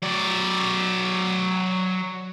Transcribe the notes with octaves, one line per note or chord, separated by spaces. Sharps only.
F#3 D5